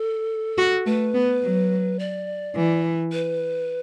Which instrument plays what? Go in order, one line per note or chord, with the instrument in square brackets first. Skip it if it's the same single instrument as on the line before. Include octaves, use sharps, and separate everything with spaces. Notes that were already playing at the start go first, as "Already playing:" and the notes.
Already playing: [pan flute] A4
[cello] F#4
[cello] A3 [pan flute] B4
[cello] B3
F#3
[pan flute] D5
[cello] E3
[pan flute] B4